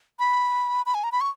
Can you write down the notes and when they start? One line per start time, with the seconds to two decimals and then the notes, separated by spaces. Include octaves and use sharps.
0.19 B5
0.86 B5
0.94 G#5
1.04 A#5
1.12 B5
1.21 C#6